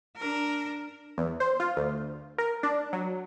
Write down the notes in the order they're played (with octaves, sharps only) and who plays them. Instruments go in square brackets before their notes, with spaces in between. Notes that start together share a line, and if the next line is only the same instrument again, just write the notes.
[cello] D4 A#4
[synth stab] E2
C5
F4
D2
A#4
D4
F#3